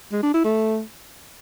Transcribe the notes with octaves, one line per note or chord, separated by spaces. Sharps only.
G#3
D4
E4
A3